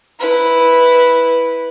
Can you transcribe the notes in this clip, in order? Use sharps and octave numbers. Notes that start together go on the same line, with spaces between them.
E4 B4